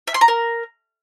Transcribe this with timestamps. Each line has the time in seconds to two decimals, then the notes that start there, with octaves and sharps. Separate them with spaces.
0.08 E5
0.14 C6
0.21 A#5
0.28 A#4